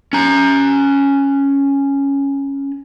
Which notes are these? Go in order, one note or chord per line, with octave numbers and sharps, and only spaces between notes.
C#4 A#5